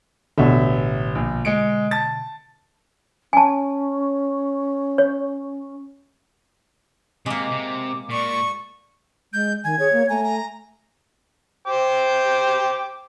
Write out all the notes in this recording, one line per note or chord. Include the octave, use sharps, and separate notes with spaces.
A1 B2 D3 E5
A#1
G#3 C#7 D7
A5 A6
C#4 G#5 A5
C#5
C3 G#3 A#3 D6
C3
A#2 D5 C#6
G#3 G6
D#3 G#5 G#6
G#4 C#5
A#3
A3 G#5 A#5
A#5
C5 G5 D6